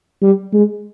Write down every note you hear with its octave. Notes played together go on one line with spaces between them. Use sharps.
G3
G#3